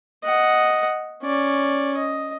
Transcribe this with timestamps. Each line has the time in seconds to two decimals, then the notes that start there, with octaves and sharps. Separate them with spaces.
0.24 D#5 F#5
1.23 C#4 D5
1.97 D#5